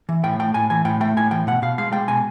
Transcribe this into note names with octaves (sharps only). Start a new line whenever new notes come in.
E3
A2 G5
A3 G5
A2 G#5
E3 G#5
A2 G5
A3 G5
A2 G#5
E3 G5
B2 F#5
B2 F5
G#3 F5
G#3 G5
B2 G#5